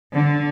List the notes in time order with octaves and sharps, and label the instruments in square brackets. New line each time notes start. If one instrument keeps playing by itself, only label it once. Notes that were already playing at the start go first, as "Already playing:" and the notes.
[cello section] D3